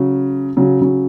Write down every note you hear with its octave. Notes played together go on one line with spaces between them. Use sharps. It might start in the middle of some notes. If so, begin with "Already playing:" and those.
Already playing: C#3 F#3
C#3 F#3
C#3 F#3